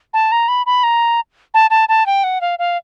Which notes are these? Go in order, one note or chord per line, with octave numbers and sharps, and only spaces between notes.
A5
A#5
B5
B5
A#5
A5
A5
A5
G5
F#5
F5
F5